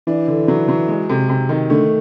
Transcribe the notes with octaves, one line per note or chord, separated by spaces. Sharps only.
E3 D4
D3
F#3
F#3
G#3
C3
C3
D#3
D3 A3